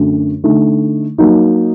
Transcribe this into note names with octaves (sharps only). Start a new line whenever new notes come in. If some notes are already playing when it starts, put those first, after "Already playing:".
Already playing: F#2 D3 A3 D4 F#4
D3 A3 D#4
F#3 A#3 D#4